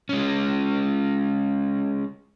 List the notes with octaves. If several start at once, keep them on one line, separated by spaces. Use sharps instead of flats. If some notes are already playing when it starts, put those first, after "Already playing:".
G#3 C#4